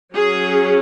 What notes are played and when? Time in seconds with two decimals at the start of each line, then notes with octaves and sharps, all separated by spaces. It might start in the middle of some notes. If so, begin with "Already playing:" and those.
0.13 F#3 C#4 G#4